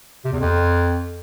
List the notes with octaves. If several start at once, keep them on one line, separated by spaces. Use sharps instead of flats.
C3
E2
F2